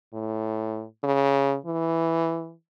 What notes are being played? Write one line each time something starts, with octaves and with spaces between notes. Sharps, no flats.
A2
C#3
E3